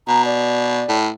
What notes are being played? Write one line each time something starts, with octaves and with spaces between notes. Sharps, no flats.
B2 A#5
D5
A2